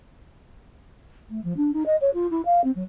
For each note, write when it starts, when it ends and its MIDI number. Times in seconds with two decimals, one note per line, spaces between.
1.30 1.42 57
1.44 1.53 53
1.57 1.73 62
1.73 1.83 63
1.86 1.96 75
2.01 2.10 73
2.14 2.27 65
2.30 2.41 64
2.45 2.61 77
2.64 2.71 60
2.75 2.83 54